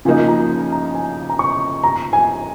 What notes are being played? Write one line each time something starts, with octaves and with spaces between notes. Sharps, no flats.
C#3 F3 A#3 D#4 G#5
A#5
A#5
G#5
A#5
C#6
A#5
G#5